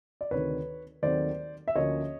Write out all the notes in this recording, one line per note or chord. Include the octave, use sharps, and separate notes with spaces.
D5
D2 C3 D#3 B4 C#5
D#2 D#3 F#3 A3 C4 C5 D5
E5
D2 D3 F3 A#3 C#4 C#5 D#5